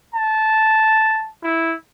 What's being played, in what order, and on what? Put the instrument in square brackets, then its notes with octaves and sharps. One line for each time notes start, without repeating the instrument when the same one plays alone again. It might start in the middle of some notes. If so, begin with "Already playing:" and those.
[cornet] A5
E4